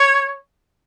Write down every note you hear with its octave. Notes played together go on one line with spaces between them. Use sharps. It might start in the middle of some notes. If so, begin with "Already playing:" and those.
Already playing: C#5